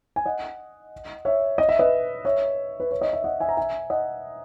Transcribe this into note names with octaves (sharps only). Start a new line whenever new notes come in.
G#5
D#5 F#5
C#5 E5
D#5
E5
B4 D#5
C#5 E5
B4
C#5
D#5
E5
D#5 F#5
E5 G#5
A#5
E5 G#5
D#5 F#5